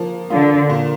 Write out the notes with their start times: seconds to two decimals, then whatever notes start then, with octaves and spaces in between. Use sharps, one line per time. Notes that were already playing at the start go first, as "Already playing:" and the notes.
Already playing: F3 A#3
0.30 D3 F4
0.69 A#2